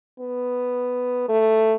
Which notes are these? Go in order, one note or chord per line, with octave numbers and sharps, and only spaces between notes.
B3
A3